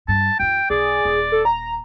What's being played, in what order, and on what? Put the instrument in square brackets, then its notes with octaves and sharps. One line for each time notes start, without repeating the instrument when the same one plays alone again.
[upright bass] G2 [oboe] A5
[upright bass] F#2 E3 [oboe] G5
[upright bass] B1 [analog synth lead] G#4 [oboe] D5
[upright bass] D#1
[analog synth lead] A4
A#5